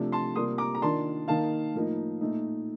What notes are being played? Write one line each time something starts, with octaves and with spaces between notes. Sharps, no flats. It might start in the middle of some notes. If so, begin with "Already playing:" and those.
Already playing: C3 F3 A3 D4 F4
A5 C6
C3 G3 A#3 F4 C6 D#6
A#5 D6
A#5
D#3 A#3 D4 F4 A5 C6
D#3 A#3 D#4 F5 A5
A2 F3 A#3 D#4
A#2 A3 D#4